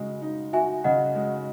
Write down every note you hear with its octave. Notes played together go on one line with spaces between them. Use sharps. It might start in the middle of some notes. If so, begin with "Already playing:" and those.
Already playing: C#3 G#3 F#4
D#4
F#4 E5 G#5
C#3 D#5 F#5
G#3